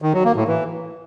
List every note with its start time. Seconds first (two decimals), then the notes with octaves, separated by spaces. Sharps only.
0.02 D#3
0.13 F#3
0.25 A#3
0.36 A2
0.47 E3